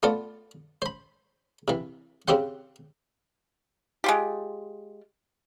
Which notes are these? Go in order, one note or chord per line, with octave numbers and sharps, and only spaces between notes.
A3 B3 F4 D5
C5 B5
C3 E3
C#3 C4 G4 C5 F#5
G#3 F4 G4